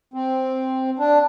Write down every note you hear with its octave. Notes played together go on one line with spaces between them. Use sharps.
C4
D4